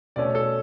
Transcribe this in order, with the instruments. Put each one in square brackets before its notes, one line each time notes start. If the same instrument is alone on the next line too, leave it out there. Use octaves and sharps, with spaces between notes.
[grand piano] B2 A3 C#4 D5
A4